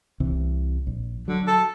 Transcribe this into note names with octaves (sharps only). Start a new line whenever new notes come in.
C2 C3 E3
A#1
D3 F#3
A4